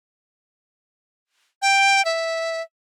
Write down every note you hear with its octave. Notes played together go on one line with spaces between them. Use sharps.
G5
E5